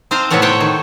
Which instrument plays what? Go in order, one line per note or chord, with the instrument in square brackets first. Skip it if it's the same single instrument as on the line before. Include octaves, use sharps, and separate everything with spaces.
[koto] C4 C5 D#5 F5 A5 A#5
A2 C3 B3 A4 C#5 F#5
C5 C#5 F#5 G5
D#3